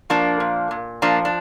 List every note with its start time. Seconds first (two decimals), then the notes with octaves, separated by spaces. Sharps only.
0.10 F3 A#3 D4
0.40 A#2
0.71 A#2
1.02 F3 A#3 D4
1.25 D4